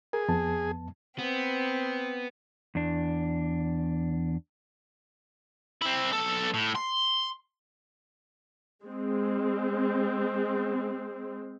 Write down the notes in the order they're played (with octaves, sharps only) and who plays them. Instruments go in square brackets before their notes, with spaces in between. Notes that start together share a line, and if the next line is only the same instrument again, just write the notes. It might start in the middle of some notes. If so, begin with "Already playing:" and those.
[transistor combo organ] G#4 [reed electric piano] A#4
[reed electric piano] F2 B3 A5
[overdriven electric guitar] B3 [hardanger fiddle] C4
[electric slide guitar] E2 D4
[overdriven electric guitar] C4 E4
B1 A4
A2
C6
[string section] G#3 C4